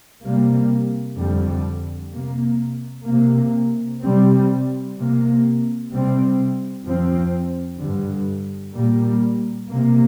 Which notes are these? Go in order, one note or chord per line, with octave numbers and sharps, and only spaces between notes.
C3 G3 A#3
F2 D3 G3
C3 A#3
C3 A#3
C3 G3 C4
C3 A#3
C3 G3 C4
F2 F3 C4
G2 D3 G3
A#2 G3 A#3
C3 A#3